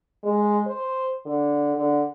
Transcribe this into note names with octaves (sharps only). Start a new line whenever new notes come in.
G#3
C5
D3
D3